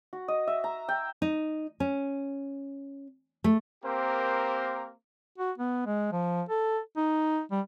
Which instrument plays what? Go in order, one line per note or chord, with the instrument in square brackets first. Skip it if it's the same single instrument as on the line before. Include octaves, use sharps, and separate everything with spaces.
[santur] F#4
D#5
E5
A#5
G5
[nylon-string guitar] D#4
C#4
A3
[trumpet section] A#3 C4 G4 A#4 C5
[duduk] F#4
B3
G#3
F3
A4
D#4
G3